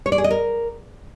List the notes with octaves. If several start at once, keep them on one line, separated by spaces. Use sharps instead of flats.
C#5
D5
G#4
D#5
A#4